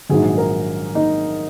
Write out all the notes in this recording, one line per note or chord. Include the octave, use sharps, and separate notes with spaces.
A#1 G#2 D#3 F#3 G#4
A#4
D#4